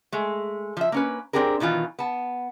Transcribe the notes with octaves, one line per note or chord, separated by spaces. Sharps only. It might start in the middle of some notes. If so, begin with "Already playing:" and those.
G#3 A3
F3 E5
A#3 C#4 B4
C4 D4 G4 G#4 A#4
B2 D#3 E3 F4
B3 A5